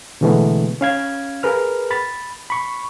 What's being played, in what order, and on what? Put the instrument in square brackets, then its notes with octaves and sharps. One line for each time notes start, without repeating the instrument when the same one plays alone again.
[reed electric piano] B2 D3 E3 G#3 A3 B3
C#4 F5 G#6
G#4 A#4 B4 F6
B5 A6
B5 C#6